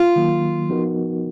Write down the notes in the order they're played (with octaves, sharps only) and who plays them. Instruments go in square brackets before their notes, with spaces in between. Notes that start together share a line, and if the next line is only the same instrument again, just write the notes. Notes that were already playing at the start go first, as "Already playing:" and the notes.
Already playing: [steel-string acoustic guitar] F4
[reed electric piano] D#3 F#3 A#3
F3 B3 D#4 F#4 A#4